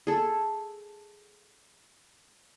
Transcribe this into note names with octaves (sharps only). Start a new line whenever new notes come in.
G#4 A4